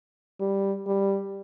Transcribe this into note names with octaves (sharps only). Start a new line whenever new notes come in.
G3
G3